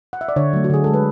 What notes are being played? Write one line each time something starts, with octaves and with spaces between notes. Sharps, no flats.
F#5
E5
D5
D3 C#5
F#3 A3
F#4
D3 G#4
G#3 A4
B4